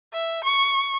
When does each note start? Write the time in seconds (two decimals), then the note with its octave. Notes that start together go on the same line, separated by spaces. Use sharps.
0.13 E5
0.44 C#6